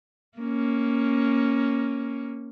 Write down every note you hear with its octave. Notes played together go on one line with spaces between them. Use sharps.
A#3 C#4